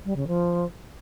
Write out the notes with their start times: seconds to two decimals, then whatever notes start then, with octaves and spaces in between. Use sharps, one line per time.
0.05 G3
0.16 C#3
0.27 F3